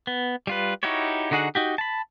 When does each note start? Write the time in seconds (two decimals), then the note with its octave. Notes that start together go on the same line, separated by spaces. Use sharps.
0.07 B3
0.47 G3 F4 B4
0.83 D#4 E4 F#4 G4 C#5
1.31 D3 D#4 F#4 G#4 F#5
1.55 D#4 F#4 G4
1.78 A5 B5